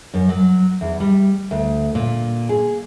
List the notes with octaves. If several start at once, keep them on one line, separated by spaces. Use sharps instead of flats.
F#2
F#3
E2
G3
D2
A#2
G#4